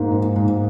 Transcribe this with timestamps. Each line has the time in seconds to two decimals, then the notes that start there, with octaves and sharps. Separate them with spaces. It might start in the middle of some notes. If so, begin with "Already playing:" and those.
Already playing: G#2 A#3 D#4
0.12 G#2
0.36 G#2